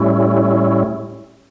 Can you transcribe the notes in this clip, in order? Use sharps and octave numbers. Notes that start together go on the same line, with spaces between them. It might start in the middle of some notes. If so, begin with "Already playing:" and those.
Already playing: A2 G3 C#4 E4